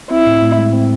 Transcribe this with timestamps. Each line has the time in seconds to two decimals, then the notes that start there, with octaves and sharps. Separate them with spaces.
0.11 C4 E4
0.27 A2
0.42 A2
0.58 G#3
0.73 C4